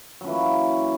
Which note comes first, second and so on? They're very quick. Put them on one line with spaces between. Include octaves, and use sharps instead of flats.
F#3 C#4 E3 A#3